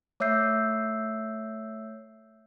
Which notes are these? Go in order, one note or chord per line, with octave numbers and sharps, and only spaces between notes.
A3 C#5 E5 E6 G6 C7